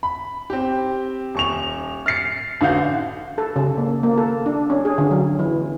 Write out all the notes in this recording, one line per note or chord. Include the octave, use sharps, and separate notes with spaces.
B5
C4 G4
D#1 C#6 F7
F6 A6 C7 C#7
A1 D3 F#4 F5 G6
A4
C#3
A#3
A#3
A4
D4
C#4
G#4
D3
F#3
E3